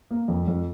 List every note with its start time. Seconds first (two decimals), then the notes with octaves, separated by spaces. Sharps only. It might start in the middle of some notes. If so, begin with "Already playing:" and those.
0.11 A#3
0.28 F2
0.47 F2